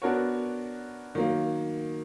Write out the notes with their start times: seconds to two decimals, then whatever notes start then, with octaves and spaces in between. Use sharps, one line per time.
0.02 B3 D4 F#4 A#4 C#5
1.15 D#3 F#3 A#3